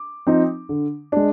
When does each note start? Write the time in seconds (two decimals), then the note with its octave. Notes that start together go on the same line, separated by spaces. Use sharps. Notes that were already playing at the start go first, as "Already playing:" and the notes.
Already playing: D6
0.27 F3 C4 D#4
0.69 D3
1.12 G#3 D4